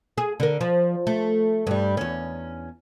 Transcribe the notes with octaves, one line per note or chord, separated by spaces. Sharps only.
G#4
D3 A#4
F3
A3
G2 G3
E2 C#4